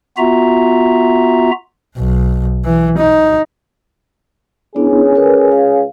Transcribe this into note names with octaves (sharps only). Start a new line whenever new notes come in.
B3 F4 F#4 E5 A#5
B1
E3
D#4
C#2 B3 C#4 D4 E4 G#4
A#4 B4
F5